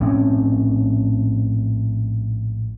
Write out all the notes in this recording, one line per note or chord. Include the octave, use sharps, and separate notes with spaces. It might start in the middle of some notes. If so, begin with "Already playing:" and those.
A#1 A2 C4 C#4